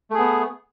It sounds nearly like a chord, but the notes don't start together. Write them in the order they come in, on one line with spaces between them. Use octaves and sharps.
A3 G#4 B3